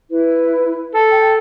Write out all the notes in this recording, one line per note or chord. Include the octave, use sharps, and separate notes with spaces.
E4 B4
A4
G5